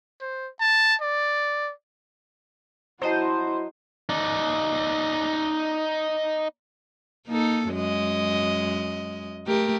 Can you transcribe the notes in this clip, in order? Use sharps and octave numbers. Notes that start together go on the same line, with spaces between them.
C5
A5
D5
F#3 E4 F#4 C5 D#5 A5
D#4 D5
A#3 D#4 A4
F#2 G#3 D#5
A3 G4 A#4